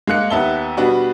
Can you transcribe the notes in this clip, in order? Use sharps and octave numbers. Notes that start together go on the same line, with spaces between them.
G#3 A#3 F#6 C#7
D#2 B3 E5 A5 G7
B2 G3 B3 D4 F#4